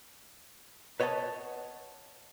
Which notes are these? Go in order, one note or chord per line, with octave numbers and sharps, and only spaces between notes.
B4 C#5 D#5 F#5 A5